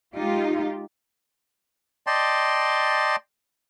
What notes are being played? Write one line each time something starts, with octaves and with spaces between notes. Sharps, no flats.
G#3 D#4 F4 G4
D5 D#5 G5 A5 C6